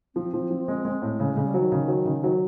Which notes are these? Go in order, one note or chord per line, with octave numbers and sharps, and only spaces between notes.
F3 C4
F3
F3
G#3
G#3
A2
C#3 G#3
C#3 G#3
G3
D#3 F#3
C#3
F#3
C#3
F#3